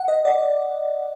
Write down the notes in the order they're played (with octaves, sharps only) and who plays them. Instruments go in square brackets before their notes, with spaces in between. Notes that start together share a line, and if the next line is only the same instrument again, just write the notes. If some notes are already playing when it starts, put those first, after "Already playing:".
Already playing: [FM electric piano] F#5
D#5
D5